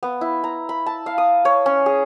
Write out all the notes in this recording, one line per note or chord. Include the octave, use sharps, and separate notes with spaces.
B3
E4
A#5
B5
A5
F5
D#6
C#5
C#4
G#4